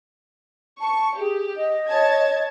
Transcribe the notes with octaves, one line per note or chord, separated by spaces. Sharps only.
A5 C#6
G4 G#4
D#5
C#5 A5 G#6